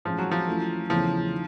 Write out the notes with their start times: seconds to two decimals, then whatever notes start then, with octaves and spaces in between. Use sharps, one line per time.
0.05 A2 E3 F3 G#3 C#4 E4
0.18 F#3
0.31 F3
0.47 E3 A3 C#4 F4
0.90 E2 C#3 E3 F3 A3
1.32 D#3